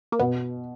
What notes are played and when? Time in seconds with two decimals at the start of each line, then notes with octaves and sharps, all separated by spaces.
0.12 A#3
0.19 B2 B3